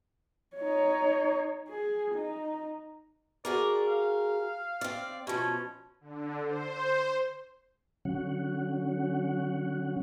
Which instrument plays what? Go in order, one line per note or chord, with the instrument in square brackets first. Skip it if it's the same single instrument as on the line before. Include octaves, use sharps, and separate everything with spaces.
[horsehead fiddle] D#4 C#5
G#4
D#4
[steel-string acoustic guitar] F#4 G#4 A#4 [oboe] D5
[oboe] F5
[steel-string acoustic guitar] C4 D5
[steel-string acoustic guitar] B2 F3 [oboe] C#4
[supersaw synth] D3
C5
[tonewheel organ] D3 F#3 C#4 F#5